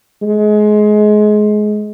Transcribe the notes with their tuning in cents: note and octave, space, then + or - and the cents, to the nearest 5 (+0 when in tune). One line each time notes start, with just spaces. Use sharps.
G#3 +25